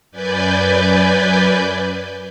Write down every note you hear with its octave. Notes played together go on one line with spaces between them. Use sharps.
F#2 B4 D5 G#5 G6